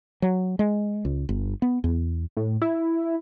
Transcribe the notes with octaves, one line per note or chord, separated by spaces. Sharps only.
F#3
G#3
C#2
G1
B3
E2
A2
E4